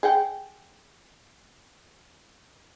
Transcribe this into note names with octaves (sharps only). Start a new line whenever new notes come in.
G#4 F#5 G5